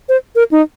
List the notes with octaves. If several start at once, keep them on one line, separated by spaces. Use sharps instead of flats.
C5
A#4
D#4